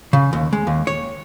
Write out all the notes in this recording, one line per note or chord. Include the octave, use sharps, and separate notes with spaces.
C#3
D#2
G#3
D#2
C#5